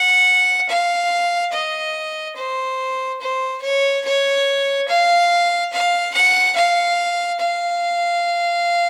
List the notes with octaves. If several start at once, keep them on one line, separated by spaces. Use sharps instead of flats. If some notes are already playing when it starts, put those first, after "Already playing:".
Already playing: F#5
F5
D#5
C5
C5
C#5
C#5
F5
F5
F#5
F5
F5